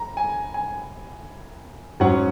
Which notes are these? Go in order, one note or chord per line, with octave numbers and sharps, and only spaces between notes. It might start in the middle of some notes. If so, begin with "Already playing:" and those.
Already playing: A#5
G#5
G#5
G#2 F#3 C#4 F#5